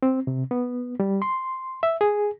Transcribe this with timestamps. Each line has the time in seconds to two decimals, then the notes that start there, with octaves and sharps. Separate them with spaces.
0.03 C4
0.27 C3
0.51 B3
1.00 G3
1.22 C6
1.83 E5
2.01 G#4